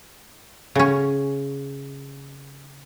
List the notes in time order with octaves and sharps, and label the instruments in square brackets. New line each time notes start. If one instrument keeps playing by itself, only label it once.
[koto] C#3 C#4